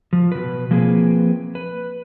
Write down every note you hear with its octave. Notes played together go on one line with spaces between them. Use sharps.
F3
B2 B4
F3 A#3 C4 G#4 B4
B4